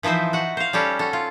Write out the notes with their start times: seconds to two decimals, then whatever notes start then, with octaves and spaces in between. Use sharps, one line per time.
0.03 E3 F3 D#4 C5 E5
0.33 F#4 F#5
0.57 C5 F5
0.73 G3 C#4 G4 A4
0.99 F#4 A4
1.13 F4